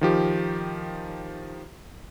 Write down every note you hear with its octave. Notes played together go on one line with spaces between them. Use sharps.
D#3 F3 G4